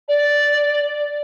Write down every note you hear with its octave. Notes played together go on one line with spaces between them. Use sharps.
D5